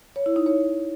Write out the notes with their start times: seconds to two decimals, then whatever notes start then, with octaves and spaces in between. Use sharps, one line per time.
0.16 C#5
0.26 E4
0.36 D#4
0.46 C#5